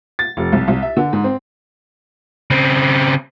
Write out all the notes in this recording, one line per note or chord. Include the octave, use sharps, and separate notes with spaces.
A6
F1
C2
C2
E5
D3
G#2
C4
C#3 C4